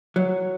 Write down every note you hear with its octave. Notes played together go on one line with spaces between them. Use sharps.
F#3